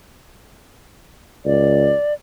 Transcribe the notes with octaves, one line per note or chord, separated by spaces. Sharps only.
C#2 D5